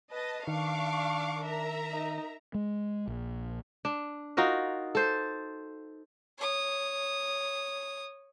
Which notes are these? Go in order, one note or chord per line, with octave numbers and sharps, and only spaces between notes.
B4 D#5 A5
D#3 D4 F5 C#6 D6
A#4 E5 A#5
D#4
G#3
A#1
D4
D#4 F4 F#4 A#4
A4 C5
C#5 D#6